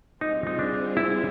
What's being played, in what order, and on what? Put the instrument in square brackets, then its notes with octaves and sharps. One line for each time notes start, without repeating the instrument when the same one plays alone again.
[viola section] G3 C4 F4 G#4 [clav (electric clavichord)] D#4
[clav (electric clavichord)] D#4
D4
E4